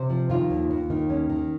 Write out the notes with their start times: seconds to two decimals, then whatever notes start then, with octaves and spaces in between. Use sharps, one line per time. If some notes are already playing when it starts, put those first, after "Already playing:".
Already playing: C3 C5
0.10 F3
0.30 D#3 F4
0.51 D#2
0.71 D#2
0.90 D#3
1.09 D#2 C#4
1.30 D#3